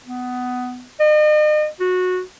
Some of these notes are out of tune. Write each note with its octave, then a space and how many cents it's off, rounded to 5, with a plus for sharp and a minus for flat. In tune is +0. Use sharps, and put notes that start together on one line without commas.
B3 +15
D#5 -40
F#4 -15